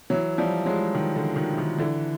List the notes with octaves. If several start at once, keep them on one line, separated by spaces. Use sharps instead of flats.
E3 F#3
F3 G3
F#3 G#3
D#3
D3
D#3
E3
D#3
D3 E3